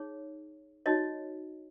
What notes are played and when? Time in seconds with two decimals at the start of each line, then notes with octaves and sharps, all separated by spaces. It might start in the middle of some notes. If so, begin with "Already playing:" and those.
Already playing: D#4 G#4 C#5
0.86 D#4 F#4 C#5 D#5